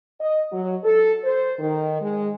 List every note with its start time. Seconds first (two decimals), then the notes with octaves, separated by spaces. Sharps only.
0.19 D#5
0.51 F#3
0.84 A4
1.24 C5
1.59 D#3
2.00 G#3